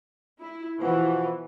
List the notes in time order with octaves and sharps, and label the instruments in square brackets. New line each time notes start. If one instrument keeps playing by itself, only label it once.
[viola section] E4
[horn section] B2 F3 F#4 [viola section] E3